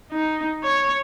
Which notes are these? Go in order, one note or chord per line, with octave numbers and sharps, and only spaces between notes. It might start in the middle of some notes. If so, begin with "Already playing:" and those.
D#4
C#5